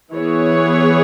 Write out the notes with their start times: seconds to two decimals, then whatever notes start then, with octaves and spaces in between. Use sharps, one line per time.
0.13 E3 B3 G#4 C#5